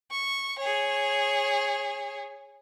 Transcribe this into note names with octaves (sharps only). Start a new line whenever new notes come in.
C#6
G#4 C#5